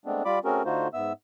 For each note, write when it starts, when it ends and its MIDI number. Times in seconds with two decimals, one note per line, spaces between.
0.06 0.23 56
0.06 0.23 57
0.06 0.23 59
0.06 0.23 60
0.06 0.23 62
0.25 0.39 55
0.25 0.39 65
0.25 0.39 74
0.25 0.39 83
0.25 0.39 86
0.45 0.63 57
0.45 0.63 60
0.45 0.63 61
0.45 0.63 66
0.45 0.63 68
0.45 0.63 70
0.65 0.88 50
0.65 0.88 57
0.65 0.88 63
0.65 0.88 65
0.65 0.88 66
0.65 0.88 72
0.94 1.13 44
0.94 1.13 59
0.94 1.13 76
0.94 1.13 88